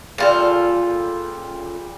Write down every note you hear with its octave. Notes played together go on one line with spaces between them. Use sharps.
A#2 C#3 G3 F4 A4 G5